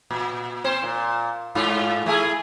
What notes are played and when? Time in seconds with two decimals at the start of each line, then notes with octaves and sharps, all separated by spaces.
0.11 A#2
0.64 C4 C5
0.83 A#2
1.55 G#2 F4
2.06 A3 E4 G#4